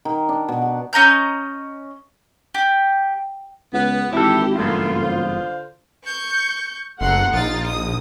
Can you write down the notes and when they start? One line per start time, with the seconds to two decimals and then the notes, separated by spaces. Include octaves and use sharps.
0.05 D#3
0.29 D4
0.48 B2
0.62 F#5
0.93 C#4 D#5 A#5 G6
2.54 G4
3.73 C#2 B3
4.13 G#1 E3 E4 G4 A4
4.58 F#1 E2 G2 A#2 A3 B3 F4
5.02 D3 C5 F5
6.04 C#6 G6
7.01 F#1 A3 F#5 A#5 C6
7.34 A#1 D#4 F4 A6
7.66 D#6